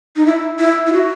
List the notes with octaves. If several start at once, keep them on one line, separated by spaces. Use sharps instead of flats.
D#4
E4
E4
E4
F#4